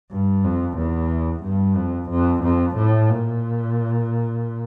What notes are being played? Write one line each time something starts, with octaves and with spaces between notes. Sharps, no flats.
G2
F2
E2
G2
F2
F2
F2
A2
A#2